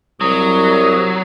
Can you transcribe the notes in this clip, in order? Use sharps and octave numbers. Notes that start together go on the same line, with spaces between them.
C2 F#3 D#6